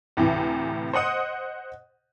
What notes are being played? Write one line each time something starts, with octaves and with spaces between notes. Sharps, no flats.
D2 A2 C3 E3
C5 D#5 F#5 D#6